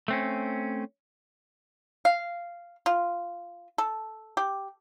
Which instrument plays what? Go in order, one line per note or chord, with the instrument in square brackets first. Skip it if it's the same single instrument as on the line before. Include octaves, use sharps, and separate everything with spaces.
[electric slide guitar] A3 C4 C#4
[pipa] F5
F4
A4
G4